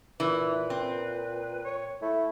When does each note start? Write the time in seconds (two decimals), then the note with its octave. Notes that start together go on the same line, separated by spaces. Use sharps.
0.20 A#2 E3 B4
0.70 C4
1.65 C#5
2.02 A3 E4